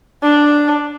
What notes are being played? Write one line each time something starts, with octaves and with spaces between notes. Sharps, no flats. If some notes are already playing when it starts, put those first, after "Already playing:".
D4